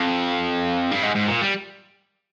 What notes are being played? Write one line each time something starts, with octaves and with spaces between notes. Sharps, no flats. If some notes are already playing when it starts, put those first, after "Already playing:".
Already playing: F2
G2
G#2
G#2
A#2
G3